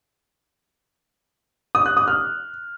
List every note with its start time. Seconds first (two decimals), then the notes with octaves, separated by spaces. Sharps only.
1.75 D#6
1.86 F#6
1.97 D#6
2.08 F6